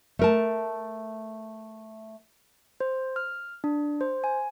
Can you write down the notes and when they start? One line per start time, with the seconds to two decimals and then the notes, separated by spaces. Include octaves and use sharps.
0.19 A3 A#4 A5
2.80 C5
3.16 F6
3.64 D4
4.01 C5
4.24 G#5